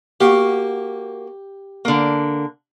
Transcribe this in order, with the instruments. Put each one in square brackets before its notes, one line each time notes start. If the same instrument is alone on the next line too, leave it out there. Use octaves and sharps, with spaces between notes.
[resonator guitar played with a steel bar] A#3 F#4 [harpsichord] G4
[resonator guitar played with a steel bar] D3 A#3